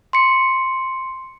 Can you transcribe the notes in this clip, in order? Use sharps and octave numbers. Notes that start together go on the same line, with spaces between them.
C6 C#7